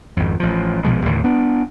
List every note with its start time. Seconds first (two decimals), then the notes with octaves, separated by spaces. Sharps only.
0.17 G#1 F2
0.40 A1 F3
0.84 A#1 B2 F3 G#3
1.06 D#2 A2 D3 E3
1.24 B3 D4